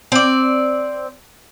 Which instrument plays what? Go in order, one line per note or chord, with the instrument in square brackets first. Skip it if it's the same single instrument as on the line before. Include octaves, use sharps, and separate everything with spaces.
[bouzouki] C4 D5